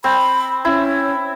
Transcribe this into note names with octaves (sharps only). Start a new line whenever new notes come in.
C4 B5
C#4 E4